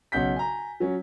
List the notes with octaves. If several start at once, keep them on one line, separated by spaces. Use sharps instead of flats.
B1 C#3 F#5 G6 B6
G#5 A#5
F#3 C#4